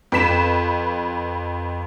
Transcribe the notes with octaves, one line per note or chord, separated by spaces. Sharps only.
F2 B4 B6 E7